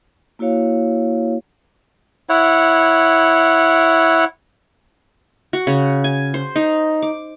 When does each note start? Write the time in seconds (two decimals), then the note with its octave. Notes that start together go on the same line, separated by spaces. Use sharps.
0.39 A#3 E4 F#4 C#5 F5
2.29 E4 C#5 F#5
5.53 F#4
5.67 C#3
6.04 G#5
6.34 C5
6.56 D#4
7.02 D6